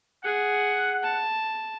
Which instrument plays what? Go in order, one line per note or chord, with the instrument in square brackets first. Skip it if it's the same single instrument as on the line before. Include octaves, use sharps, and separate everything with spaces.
[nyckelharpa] G#4 [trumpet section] F#5
[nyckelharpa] A5